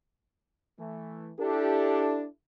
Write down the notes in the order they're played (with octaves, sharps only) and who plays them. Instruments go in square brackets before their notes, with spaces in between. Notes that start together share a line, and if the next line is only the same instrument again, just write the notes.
[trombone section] E3 A3
[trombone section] D4 [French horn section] E4 G4 A4